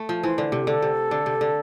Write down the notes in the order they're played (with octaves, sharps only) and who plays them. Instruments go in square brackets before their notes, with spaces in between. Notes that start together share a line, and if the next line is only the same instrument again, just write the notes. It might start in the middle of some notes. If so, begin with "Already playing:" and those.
Already playing: [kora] A3
F3
[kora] E3 [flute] C5
[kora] D3
C3
[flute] G4
[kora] D3 [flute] A4
[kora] C3
D3
C3
D3